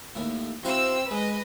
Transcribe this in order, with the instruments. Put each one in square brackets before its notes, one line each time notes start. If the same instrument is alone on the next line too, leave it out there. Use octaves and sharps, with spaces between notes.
[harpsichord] D#2 A2
[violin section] C4 E6 [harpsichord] E4 F#4 F5
[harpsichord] G#3 [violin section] B4 D#5